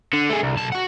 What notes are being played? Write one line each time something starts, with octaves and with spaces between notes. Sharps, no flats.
D3
A3 G#4
C2
B1 A5
F#4 F#5